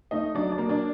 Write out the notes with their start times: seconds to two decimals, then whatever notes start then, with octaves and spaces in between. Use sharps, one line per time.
0.11 A3 D#4 D#5
0.34 F#3 D4 D5
0.52 D4 D5
0.58 A#3
0.69 D4 D5